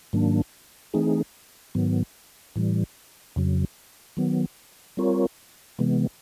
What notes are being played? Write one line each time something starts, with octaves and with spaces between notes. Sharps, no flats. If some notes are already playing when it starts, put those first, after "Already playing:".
G#2 D#3 F#3 A#3 D4
E3 A3 C4 D#4 G#4
G#2 D#3 F#3 B3
A2 E3 G3
F2 C#3 F#3
D#3 F#3 B3
G3 C4 F4 A#4 C#5
C3 E3 G#3 B3